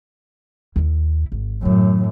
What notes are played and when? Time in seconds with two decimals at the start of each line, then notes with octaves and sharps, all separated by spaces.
0.76 D#2 E4
1.32 G#1
1.63 F#2 A2 D#3 F#3